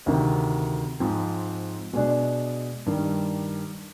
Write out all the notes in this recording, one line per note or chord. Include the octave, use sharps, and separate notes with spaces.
D2 C3 D#3
G#2 F3 C4
B2 G#3 D4
G2 D#3 G3